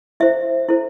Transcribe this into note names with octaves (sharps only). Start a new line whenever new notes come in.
E4 A4 C5 E5
E4 A4 C5